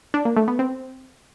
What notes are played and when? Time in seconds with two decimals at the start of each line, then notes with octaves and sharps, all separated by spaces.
0.14 D4
0.25 A#3
0.37 A3
0.48 B3
0.59 C4